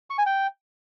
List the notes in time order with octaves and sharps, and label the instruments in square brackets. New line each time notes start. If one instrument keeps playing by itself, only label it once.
[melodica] C#6
G#5
G5